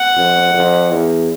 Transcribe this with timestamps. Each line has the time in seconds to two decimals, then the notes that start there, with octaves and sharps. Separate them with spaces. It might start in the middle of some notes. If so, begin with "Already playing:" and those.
Already playing: F#5
0.17 F2
0.54 F2
0.91 E2